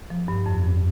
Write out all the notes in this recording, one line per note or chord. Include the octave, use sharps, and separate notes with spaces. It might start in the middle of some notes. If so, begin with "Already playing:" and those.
F3
G2
F2
F2